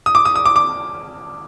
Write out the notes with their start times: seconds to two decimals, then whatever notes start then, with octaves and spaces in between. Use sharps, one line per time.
0.06 D#6
0.15 D6
0.25 D#6
0.36 D#6
0.46 D6
0.56 D6